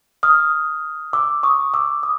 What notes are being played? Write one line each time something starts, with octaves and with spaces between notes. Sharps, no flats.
D#6 F6
D6 E6
C#6 D#6
D6 E6
D#6